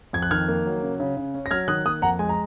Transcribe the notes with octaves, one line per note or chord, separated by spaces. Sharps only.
F2 G#6
F#6
D#3 F6 G#6
A#3
F#3
C#3
C#3
C#3
C#4
A#6
F#3 F6 G#6
D#3 D#6 F#6
A#3 D#6 F#6
F2 F#5 A#5
G#3 G#5
A#5